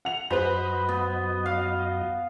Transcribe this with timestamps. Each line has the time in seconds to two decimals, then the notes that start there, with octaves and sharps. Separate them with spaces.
0.05 F#5 F7
0.30 F#2 F#4 B4 C5 D#5 F#5 B5
0.89 B3
1.46 F5